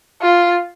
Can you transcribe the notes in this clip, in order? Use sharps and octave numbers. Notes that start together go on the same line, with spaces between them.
F4